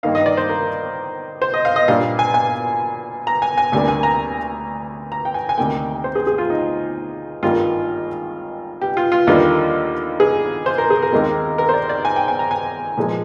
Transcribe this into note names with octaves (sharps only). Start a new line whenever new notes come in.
G2 D#3 A#3 D#4 F5
D#5
D5
C5
A#4
C5
D#5
F5
D#5
A#2 G3 D4 F5
G#5
G#5
A#5
G#5
G#5
D2 C3 G3 A#3 D4 G#5
G#5
A#5
A#5
G5
G#5
G#5
D2 C3 D#3 A#3 G5
C5
G#4
G#4
F4
D#4
G#1 G2 D#3 G3 A#3 F4
G4
F4
F4
D#2 D3 G3 A#3 F4
G#4
C5
A#4
G#4
A#4
D#2 D#3 G#3 C4
A#4
C5
D5
D5
G#5
G5
G#5
A#5
G#5
A#2 F3 G#3